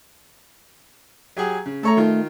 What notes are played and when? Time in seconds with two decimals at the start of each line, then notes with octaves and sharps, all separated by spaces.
1.37 F#3 G4 G#4
1.66 C#3
1.83 A3 A4 C#5 A#5
1.97 D#3 F4